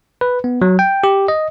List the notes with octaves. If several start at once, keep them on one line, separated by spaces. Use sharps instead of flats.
B4
B3
F#3
G5
G4
D#5